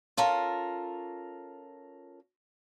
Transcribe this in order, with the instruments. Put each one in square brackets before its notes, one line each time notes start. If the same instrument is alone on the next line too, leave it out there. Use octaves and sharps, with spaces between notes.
[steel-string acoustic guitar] C#4 F4 A4 A#4